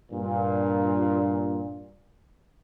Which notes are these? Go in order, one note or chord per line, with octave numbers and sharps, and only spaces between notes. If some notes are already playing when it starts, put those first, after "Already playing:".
G2 A#2